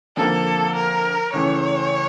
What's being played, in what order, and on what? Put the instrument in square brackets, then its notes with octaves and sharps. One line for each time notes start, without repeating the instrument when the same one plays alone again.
[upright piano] F2 D3 F3 A#3 [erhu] A4
[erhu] A#4
[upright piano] C#2 C#3 E3 A3 [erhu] C#5